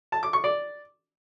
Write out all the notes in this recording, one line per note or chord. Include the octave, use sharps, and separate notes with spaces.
A5
D6
C#6
D5